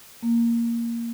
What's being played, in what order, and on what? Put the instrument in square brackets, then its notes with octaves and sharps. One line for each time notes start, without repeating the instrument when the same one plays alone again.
[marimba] A#3